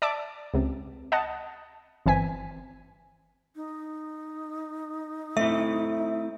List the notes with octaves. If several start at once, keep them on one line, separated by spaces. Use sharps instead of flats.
D5 E5 A5 D6
C#2 C3
D#5 F#5 A5
G1 E3 C4 G#5 B6
D#4
A3 C4 E4 E5